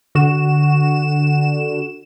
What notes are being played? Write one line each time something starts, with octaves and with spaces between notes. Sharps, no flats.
D3 F#4 E7